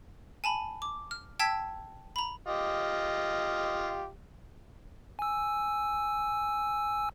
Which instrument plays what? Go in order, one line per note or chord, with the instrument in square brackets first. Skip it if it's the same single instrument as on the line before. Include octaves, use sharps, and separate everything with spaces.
[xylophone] G#5 A5 B5
D6
F6
G5 A5 E6 G#6 B6
A#5 B5
[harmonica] F4 G4 D#5
[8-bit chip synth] G#5 E6